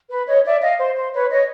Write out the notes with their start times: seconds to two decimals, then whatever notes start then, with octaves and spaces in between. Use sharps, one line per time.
0.10 B4
0.27 C#5 D#5
0.45 D5 E5
0.62 D#5 F5
0.79 C5
0.96 C5
1.13 B4 C#5
1.31 C#5 D#5